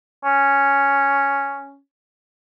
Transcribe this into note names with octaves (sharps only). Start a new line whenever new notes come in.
C#4